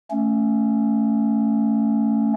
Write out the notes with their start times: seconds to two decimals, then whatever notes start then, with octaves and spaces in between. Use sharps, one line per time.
0.11 A3 C#4